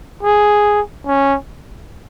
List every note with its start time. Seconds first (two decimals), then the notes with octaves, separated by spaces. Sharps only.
0.23 G#4
1.06 C#4